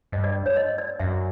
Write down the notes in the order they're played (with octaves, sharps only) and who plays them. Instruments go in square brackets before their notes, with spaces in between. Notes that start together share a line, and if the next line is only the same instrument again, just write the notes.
[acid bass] G2 [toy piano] D#5
[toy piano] D5
C#5
D#5
D5
[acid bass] F#2 [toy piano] E5